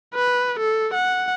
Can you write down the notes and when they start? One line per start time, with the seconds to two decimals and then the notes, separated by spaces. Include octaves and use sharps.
0.15 B4
0.59 A4
0.94 F#5